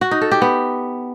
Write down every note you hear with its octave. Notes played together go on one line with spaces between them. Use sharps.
F#4
D#4
A4
G4
B3